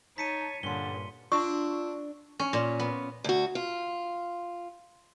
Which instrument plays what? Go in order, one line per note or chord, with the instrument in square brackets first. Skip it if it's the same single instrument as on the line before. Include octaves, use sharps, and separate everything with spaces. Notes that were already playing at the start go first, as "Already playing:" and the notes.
[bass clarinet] D#4 [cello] C#5 [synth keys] A5 [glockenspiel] B6 C#7 D#7
[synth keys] G2 [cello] A#2 C#4 [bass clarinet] D3 [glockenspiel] C6 G7
[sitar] D4 [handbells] F4 E6 [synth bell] C#6
[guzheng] C#4
A#2
B3
[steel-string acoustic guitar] D2 F#4
F4